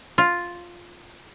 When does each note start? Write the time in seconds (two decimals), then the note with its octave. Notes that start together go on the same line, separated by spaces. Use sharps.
0.18 F4